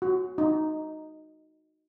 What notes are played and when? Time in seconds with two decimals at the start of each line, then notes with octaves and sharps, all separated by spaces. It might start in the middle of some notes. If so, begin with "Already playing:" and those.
0.02 F#4
0.38 D#4